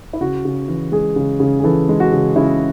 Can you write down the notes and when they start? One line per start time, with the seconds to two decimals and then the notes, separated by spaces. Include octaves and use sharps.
0.13 E4
0.21 C#3 F#4
0.45 C#3
0.68 E3
0.92 G#3 G#4
1.16 C#3
1.40 C#3
1.60 G#4
1.64 E3 A4
1.89 G#3
2.00 F#4
2.13 C#3
2.36 C#3 E4